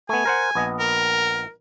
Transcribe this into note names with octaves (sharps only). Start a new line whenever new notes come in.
A3 B3 G#5
A#4 C5 F#5
A#1 B3 D#5
A#4